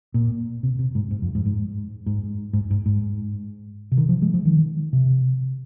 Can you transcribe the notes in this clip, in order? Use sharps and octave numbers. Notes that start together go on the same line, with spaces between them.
A#2
C3
C3
G#2
G#2
F2
G#2
G#2
G#2
G#2
G#2
G#2
C3
D#3
F3
G#3
F3
D#3
C3